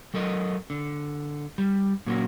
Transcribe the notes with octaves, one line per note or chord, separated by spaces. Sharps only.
F#3 A4 A#4 D#5
D3
G3
A#2 F#3 A#3 C#4 F#4